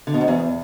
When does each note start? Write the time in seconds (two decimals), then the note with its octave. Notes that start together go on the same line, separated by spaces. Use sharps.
0.07 D3
0.14 B2
0.21 G#2
0.28 E2